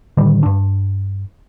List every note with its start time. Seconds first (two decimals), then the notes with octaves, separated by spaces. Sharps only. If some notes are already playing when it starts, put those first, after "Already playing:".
0.17 A2 D3 D#3 G3
0.43 G2 D4